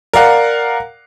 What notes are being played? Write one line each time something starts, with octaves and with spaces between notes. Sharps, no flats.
A#4 D5 F5 F#5